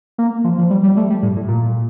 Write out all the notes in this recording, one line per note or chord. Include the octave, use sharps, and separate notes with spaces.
A#3
F3
F3
G3
G3
A3
G3
A2
A2
A#2